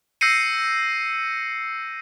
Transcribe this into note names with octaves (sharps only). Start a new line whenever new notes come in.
E6 G6 A#6 C7 C#7 D#7